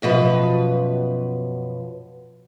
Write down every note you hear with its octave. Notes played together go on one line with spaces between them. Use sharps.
F#2 B2 F3 B4